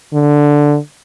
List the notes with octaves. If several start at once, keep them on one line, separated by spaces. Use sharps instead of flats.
D3